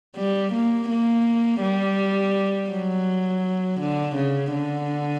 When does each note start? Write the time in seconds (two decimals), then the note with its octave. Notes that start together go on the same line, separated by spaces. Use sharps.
0.16 G3
0.53 A#3
0.89 A#3
1.61 G3
2.70 F#3
3.80 D3
4.16 C#3
4.52 D3